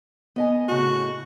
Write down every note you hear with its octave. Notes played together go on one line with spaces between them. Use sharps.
B3 D#5 G#5
A2 C#3 F#4